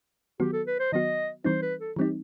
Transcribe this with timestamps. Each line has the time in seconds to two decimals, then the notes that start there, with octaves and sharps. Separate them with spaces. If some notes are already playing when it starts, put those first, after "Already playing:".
0.40 D#3 F#3 B3 F#4 G4
0.53 A4
0.67 B4
0.79 C5
0.92 D#3 F#3 B3 F#4 D#5
1.45 E3 G3 C4 D#4 C5
1.62 B4
1.80 A4
1.96 E3 G3 C4 D#4 G4